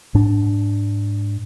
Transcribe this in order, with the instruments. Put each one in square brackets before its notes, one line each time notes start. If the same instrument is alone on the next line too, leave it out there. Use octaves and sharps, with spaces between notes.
[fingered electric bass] G#2 D4